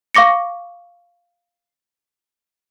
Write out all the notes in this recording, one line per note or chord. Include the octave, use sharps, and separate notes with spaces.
F5 C#6 D6 A#6 C#7